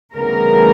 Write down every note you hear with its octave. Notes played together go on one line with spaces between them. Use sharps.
D2 C#3 E3 G3 B3 A#4